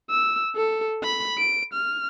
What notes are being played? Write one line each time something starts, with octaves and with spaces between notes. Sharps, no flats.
E6
A4
B5
D7
F6